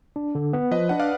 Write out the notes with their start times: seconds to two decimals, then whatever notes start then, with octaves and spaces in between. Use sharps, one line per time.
0.16 D4
0.35 D3
0.53 B3
0.71 F3 B4 D#5
0.89 D4 F#5
0.99 D5 F5